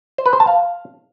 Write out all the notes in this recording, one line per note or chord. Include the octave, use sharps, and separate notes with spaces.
C5
B4
C5
A5
F5